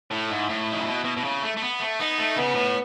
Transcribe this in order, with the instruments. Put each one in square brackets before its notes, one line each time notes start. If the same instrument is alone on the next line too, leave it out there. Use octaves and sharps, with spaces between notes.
[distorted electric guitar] A2 [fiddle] E4
[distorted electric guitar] G#2
A2
D#3
C#3
B2
B2
B2
C#3
A3
A3
B3
A3
[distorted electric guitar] B3 [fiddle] D#4
[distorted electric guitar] A3
[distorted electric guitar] C#3 [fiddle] B3
[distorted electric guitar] A2